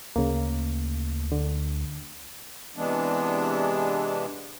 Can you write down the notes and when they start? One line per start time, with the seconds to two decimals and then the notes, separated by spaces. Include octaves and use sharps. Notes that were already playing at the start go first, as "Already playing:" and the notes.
0.16 D2 C#3 A#3
1.32 D3
2.77 C3 E3 G#3 B3 D4